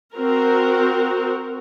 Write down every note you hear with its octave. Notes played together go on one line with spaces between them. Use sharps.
C4 F#4 A#4